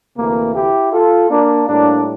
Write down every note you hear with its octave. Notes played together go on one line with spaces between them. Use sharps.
D2 C3 E3 A3 A#3
E4 G4
F4 A4
A#3 D4
A2 G3 A#3 D4